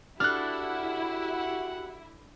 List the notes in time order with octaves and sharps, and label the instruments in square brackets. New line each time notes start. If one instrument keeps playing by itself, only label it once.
[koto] D4 A4 [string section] E4 [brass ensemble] F#4 G4 F#5 [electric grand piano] F6 F#6